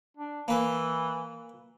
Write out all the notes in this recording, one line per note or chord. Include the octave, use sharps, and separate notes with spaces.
D4
E3 A#3 B4